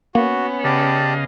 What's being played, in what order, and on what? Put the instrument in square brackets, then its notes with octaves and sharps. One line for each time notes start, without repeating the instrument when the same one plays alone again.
[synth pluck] A#3 [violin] B3 C#4 [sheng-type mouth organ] F#4
[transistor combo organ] C#3 D#5 F5 [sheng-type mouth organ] G4 D5 A5